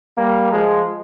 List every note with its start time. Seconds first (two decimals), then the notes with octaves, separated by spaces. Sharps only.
0.17 G3 A#3
0.52 F3 G#3